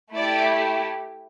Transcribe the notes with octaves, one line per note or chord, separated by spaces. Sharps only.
A3 E4 G4 D5